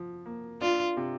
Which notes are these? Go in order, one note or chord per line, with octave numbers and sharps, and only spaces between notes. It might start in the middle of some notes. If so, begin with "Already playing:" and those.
Already playing: F3
A#3
D4 F4
C3